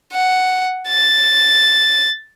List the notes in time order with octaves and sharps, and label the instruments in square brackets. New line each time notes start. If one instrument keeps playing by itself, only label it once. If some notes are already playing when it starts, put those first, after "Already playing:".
[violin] F#5
A6